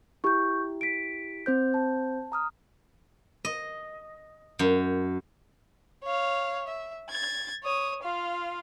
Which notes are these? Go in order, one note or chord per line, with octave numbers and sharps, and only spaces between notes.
E4 G4 C#6 G6
B6 D7
C4 C5 G6
A5
A#5 D#6 F6
D#5
F#2
C#5 F5
E5
G#6 A6
C#5 D#6
F4 F5